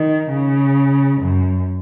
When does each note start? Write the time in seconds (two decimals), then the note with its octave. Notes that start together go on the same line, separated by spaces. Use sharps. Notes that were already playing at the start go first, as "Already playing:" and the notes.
Already playing: D#3
0.30 C#3
1.21 F#2